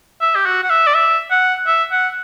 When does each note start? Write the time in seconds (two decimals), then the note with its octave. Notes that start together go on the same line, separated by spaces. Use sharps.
0.21 E5
0.36 G4
0.46 F#4
0.63 F#5
0.70 E5
0.87 D5
0.95 E5
1.31 F#5
1.67 E5
1.92 F#5